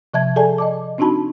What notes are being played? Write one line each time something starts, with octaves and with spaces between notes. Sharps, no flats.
C3 F3 E5 A5 G#6
G#4 A4 D5 G#5 A5
D#5 A5 D6
C4 D4 D#4 F#4 A5 B5